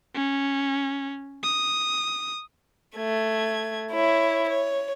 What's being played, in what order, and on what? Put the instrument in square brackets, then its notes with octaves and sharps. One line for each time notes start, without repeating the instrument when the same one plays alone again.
[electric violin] C#4
D#6
[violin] A3 G#6
E4 C#5
C#5